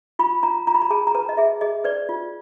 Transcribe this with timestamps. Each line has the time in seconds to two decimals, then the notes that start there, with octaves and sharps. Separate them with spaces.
0.19 F4 B5
0.43 F4 A#5
0.67 F4 A#5
0.75 B5
0.82 A#5
0.90 G#4 A5
1.07 A#5
1.15 B4 A5
1.29 D#5
1.37 G#4 E5
1.61 G#4 D#5
1.84 B4 D5
2.09 F4